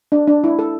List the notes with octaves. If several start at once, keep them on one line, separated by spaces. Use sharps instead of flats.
D4
D4
E4
A4